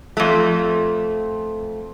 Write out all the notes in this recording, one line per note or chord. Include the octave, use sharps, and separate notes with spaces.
F2 A3